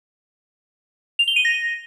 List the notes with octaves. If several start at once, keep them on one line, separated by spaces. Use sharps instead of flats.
F7
G7
D#7
A#6